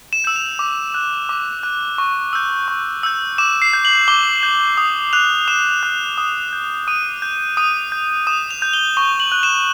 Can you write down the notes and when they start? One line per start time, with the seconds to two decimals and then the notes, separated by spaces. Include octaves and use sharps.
0.13 E7
0.24 E6 G6 E7
0.36 F7
0.59 D6
0.94 F#6
1.29 D6
1.63 F#6
1.98 C#6
2.33 E6 G6
2.68 C#6
3.03 E6 G6
3.38 D6 E7
3.62 C7
3.73 G6
3.85 F#7
4.08 D6 G7
4.43 G6
4.78 D#6
5.13 F#6 F7
5.48 D#6 E7
5.83 F#6
6.18 D#6
6.52 G6
6.87 D#6 D#7
7.22 G6
7.57 D#6 D#7
7.92 G6
8.27 D#6 E7
8.51 F7
8.62 G6
8.73 G7
8.97 C#6 G7
9.20 F#7
9.32 F#6
9.43 E7